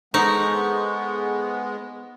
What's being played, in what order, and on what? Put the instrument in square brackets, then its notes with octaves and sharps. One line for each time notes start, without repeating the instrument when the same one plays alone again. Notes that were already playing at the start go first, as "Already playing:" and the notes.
[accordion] G#3 B3 [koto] D#4 [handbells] A4 C5 C#6